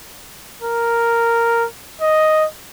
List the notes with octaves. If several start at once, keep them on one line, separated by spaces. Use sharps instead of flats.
A#4
D#5